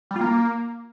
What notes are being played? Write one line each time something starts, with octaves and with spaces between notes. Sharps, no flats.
G3
F4
A#3